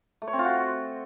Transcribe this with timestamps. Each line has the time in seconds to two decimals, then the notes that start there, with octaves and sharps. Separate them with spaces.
0.22 A3
0.27 C#5
0.33 C4
0.39 F4
0.45 F#4